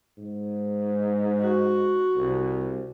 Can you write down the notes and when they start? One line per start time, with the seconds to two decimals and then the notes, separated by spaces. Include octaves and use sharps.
0.17 G#2
1.40 F#4
2.16 C2